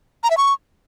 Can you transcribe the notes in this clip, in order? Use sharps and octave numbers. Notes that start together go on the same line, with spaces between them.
A#5
E5
C#6